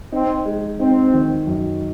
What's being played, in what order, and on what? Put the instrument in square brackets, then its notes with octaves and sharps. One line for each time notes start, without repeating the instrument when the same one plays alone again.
[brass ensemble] C4 [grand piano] D#4
[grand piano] G#3
[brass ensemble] C4 [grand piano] D#4
[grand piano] D#3
F#2